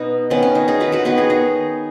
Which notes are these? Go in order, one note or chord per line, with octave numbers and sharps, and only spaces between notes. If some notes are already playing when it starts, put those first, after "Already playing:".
Already playing: B2 B3 D#4
D#3 B3 C#4
C#4
D#4
D#4 G#4
F#4 B4
F#4 B4
D#3 B3 F#4 B4
G#4 C#5
D#4 G#4